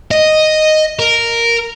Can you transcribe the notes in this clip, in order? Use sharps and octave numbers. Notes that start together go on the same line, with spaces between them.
D#5
A#4